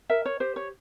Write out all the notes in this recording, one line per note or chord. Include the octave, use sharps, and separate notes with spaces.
A#4 E5
C#5
G4 C5
C#5